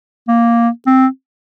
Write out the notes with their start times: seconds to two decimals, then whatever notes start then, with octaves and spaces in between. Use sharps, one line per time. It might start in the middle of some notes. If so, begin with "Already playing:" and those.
0.28 A#3
0.86 C4